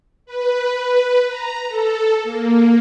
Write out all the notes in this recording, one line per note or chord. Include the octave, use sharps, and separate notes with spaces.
B4
A#5
A4
A#3